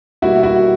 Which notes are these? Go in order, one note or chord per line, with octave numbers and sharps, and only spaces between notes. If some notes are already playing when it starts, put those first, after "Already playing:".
B2 G3 A#3 E4 F#4
E4 F#4